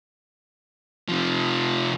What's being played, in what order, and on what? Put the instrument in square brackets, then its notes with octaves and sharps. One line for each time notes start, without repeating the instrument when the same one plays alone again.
[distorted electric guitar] C3 F3